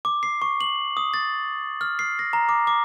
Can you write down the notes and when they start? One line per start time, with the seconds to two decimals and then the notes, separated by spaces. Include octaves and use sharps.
0.05 D6
0.23 C7
0.42 C#6
0.61 F#7
0.97 D#6
1.14 A6
1.81 F6
1.99 C7
2.19 A#6
2.33 A#5
2.49 D6
2.67 D6